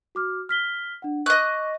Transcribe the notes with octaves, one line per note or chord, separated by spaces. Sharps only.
F#4 D6 F6
F6 B6 G7
D4 F#5
D#5 C#6 D6 F#6